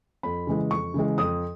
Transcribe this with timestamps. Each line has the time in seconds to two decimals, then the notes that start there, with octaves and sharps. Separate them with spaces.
0.23 F2 B5
0.47 C#3 E3 G#3
0.71 F2 C#6
0.94 C#3 E3 G#3
1.18 F2 D#6